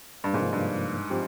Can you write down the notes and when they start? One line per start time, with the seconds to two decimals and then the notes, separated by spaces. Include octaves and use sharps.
0.24 G2
0.33 G#2 C3 F3 A#3
0.52 G2
1.10 F3 C4 G4